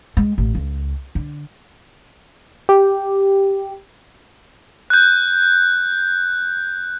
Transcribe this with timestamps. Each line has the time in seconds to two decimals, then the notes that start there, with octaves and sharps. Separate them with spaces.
0.17 G#3
0.38 A1
0.55 C#2
1.15 D3
2.69 G4
4.90 F#6 G6